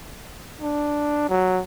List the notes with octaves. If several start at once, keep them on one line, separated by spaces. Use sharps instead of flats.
D4
F#3